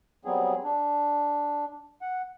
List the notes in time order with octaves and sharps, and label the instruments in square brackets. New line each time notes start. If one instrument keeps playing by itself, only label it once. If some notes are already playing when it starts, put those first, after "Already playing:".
[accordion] F#3 G3 B3 C4 G#4
D4
F#5